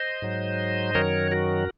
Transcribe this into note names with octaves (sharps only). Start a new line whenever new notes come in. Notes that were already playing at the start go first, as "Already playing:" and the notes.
Already playing: C5 D#5
G#2 F#3
F#2 D#3 F#3 A#4 C#5
F#4 A#4